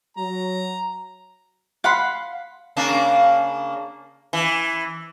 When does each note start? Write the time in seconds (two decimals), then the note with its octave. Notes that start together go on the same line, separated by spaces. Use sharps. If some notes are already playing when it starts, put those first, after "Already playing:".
0.17 F#3 A#5
1.84 F5 F#5 B5 C6
2.77 C#3 A#3 D4
4.33 E3